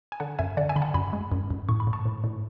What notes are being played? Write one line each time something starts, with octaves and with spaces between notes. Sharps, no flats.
G#5
D3 F#5 A5
F#2 E5 G#5
D3 D5 F#5
E5 G#5
D3 B5
F#5 A5
F#2 G#5 B5
G#3
F#2
F#2
A2 C#6
B5
A2
A5 C#6
A2
A2